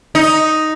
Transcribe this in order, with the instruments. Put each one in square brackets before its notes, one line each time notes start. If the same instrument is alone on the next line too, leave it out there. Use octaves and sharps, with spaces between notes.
[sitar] D#4